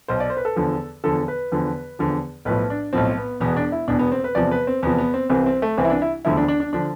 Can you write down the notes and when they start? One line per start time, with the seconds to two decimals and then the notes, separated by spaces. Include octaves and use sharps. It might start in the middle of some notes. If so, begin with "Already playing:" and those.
0.08 B1 B2 C5
0.20 D5
0.30 C5
0.37 B4
0.45 A4
0.56 E2 D3 F3
1.04 E2 D3 F3 A4
1.28 B4
1.52 E2 D3 F3
1.99 E2 D3 F3
2.45 B1 A2 F3 B4
2.70 D4
2.93 B1 A2 F3 C4
3.18 B3
3.40 E1 E2 B2 B3
3.56 D4
3.72 E4
3.88 E1 E2 B2 D4
3.99 B3
4.12 C4
4.24 B4
4.35 E2 C3 F3 D5
4.51 B4
4.67 C4
4.83 E2 C3 F3 B3
4.98 B3
5.14 C4
5.30 C2 C3 E3 C4
5.46 C4
5.62 A3
5.77 C2 C3 E3 C4
5.85 E4
5.90 D4
6.02 E4
6.25 E1 D2 D3 F3 E4
6.37 D4
6.48 D4
6.60 D4
6.73 D3 F3 D4